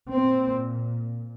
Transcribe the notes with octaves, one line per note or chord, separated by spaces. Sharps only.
A#2 C4